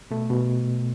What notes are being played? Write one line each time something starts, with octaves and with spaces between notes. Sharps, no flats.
B2 A3
B2